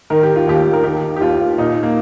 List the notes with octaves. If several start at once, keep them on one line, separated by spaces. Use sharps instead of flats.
D#3 A#4
G4
F4
D#2 G4
A#4
D#3 G4
G4
D#2 F4
A#2 D#4
A#3